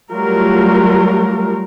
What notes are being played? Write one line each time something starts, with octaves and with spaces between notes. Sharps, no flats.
F#3 G3 A3 F4 A#4